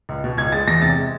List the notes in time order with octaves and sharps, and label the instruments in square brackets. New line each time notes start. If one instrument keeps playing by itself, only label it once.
[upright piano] C#2
B2
C#2 G#6
G#3 A6
E2 A#6
C3 A6
G#3